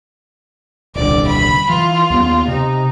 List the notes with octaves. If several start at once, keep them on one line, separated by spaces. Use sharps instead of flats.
D#1 C2 D3 D5
B5
E3 F4
D#2 A3 B3
C3 D#4